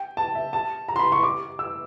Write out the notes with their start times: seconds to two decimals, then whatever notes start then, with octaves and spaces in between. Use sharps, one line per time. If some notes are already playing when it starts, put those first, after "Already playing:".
Already playing: G5
0.17 A5
0.35 E5
0.53 A5
0.88 A#5
0.96 C6
0.99 B5
1.12 C#6
1.23 D6
1.59 E6